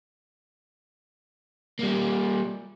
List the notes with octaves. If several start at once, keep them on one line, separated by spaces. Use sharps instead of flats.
G3 A#3